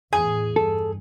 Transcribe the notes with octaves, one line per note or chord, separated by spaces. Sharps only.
E2 A2 G#4 G#5
G2 A4